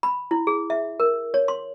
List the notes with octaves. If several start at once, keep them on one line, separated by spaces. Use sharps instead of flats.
B5
E4
G#4
E5
A#4
C#5
C6